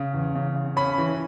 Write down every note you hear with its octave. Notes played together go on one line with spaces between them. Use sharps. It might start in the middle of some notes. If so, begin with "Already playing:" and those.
Already playing: C#3
E2
C#3
C#3
C#4 B5
E3